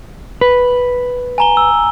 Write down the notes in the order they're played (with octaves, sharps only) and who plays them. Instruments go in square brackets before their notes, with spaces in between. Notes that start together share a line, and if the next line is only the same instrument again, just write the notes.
[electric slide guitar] B4
[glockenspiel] G#5 A#5 G7
E6